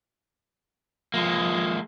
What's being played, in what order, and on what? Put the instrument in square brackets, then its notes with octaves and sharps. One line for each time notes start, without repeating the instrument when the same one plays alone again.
[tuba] F3 [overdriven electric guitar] G#3 A#3